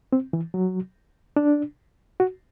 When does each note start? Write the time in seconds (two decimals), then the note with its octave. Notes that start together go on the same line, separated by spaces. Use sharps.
0.13 C4
0.33 E3
0.54 F#3
1.36 D4
2.20 F#4